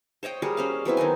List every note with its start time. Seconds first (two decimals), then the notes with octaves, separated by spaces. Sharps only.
0.23 C5 C#5 D#5 G5
0.42 G3 F#4 G#4 A#4
0.57 C#4 C5 F5
0.85 F#3 B3 C4 E4
0.97 D#3 D4 D#4 G#5